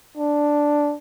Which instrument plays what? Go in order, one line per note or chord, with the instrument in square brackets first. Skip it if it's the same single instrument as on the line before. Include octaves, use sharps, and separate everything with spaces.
[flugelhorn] D4